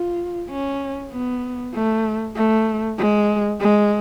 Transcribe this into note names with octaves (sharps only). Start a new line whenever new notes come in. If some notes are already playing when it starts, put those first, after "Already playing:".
Already playing: F4
C#4
B3
A3
A3
G#3
G#3